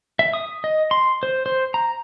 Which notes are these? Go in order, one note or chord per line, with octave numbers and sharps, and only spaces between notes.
E5
D#6
D#5
C6
C5
C5
A#5